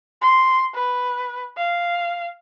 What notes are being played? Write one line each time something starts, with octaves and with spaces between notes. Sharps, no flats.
C6
B4
F5